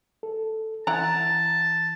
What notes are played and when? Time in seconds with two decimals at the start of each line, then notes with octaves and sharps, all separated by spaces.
0.23 A4
0.87 E3 E4 F#5 A5 A#5